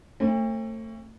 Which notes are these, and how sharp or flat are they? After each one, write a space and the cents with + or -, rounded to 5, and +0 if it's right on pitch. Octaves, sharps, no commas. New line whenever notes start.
A3 +25 C4 +40